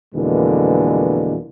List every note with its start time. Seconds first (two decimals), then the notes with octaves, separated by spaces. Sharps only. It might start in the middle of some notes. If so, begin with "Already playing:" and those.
0.15 F2 B2 D3 E3 G#3 A#3